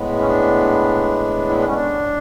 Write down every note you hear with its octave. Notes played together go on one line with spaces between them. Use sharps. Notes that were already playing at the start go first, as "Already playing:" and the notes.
Already playing: A2 G#3 B3
C#4
D4
E4
D4
C#4
D4